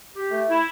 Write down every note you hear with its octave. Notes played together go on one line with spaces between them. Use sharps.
G4
A3
E4